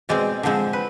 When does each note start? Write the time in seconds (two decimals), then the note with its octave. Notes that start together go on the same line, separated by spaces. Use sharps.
0.09 B2 G#3 C4 D5
0.43 D3 F3 G#3 C4
0.73 B4